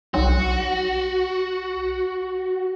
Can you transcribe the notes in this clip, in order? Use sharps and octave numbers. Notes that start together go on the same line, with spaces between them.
B1 F#4